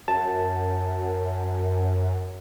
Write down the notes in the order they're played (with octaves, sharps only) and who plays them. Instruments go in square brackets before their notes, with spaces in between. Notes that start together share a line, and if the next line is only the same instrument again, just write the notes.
[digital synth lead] F#2 [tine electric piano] A5